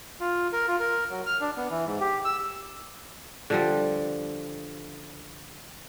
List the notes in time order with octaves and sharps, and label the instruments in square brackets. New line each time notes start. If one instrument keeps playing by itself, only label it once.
[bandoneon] F4
A#4
F4
A#4
F#3
F6
D4
B3
E3
G#2
G4
E6
[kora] D3 F3 G3